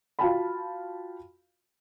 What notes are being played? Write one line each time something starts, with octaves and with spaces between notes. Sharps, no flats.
F4 F#4 F5 G5 A5 B5